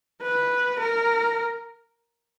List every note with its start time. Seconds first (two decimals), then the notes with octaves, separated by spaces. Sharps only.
0.22 B4
0.80 A#4